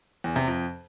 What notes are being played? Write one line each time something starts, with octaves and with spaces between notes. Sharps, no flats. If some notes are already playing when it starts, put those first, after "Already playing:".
E2
C3
F2